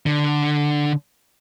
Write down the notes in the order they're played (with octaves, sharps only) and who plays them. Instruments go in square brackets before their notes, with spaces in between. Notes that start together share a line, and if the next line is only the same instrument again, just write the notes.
[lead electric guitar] D3